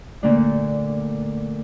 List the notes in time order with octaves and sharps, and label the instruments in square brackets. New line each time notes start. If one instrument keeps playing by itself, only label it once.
[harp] A#2 D3 A3 A#3 D4